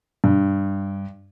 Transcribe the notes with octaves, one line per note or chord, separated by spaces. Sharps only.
G2